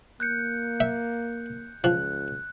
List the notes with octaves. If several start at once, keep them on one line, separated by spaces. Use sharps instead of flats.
A#3 F#6 G6 C#7
E5
C#2 F3 F#6